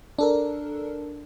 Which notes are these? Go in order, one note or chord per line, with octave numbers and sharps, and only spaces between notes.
D4 A4 A#4